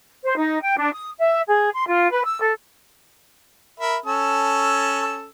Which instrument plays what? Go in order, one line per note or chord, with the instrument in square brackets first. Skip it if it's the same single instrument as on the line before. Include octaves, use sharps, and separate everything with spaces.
[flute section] C5
D#4
G5
D4
D#6
E5
G#4
C6
F4
B4
E6
A4
[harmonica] A#4 E5 B5
C#4 A4 E6